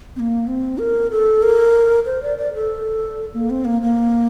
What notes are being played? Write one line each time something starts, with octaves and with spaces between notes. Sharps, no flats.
C4
A#3
C4
A#4
A4
A#4
C5
D5
D5
A4
A#3
C4
A#3
A#3